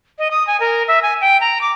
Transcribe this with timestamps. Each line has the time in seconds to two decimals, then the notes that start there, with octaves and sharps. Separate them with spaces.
0.19 D#5
0.31 D#6
0.47 G#5
0.60 A#4
0.88 E5
1.03 G#5
1.21 G5
1.41 A#5
1.61 D6